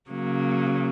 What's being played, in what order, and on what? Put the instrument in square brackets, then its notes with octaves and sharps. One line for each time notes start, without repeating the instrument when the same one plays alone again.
[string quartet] C#3 F#3 A#3